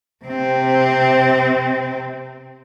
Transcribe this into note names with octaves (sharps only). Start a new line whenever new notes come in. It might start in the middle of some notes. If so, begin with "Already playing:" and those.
C3 C4